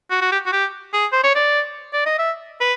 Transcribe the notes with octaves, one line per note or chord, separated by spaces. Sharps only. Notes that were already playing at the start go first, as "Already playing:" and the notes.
F#4
F#4
G4
F#4
G4
G#4
C5
C#5
D5
D5
D#5
E5
B4